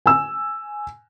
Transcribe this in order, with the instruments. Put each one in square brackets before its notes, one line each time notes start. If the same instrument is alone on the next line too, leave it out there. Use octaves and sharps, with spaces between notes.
[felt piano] G#5 E6